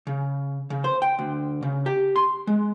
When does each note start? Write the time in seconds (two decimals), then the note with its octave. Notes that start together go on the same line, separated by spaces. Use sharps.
0.07 C#3
0.70 C#3
0.84 C5
1.02 G5
1.19 D2
1.62 C#3
1.86 G4
2.16 C6
2.47 G#3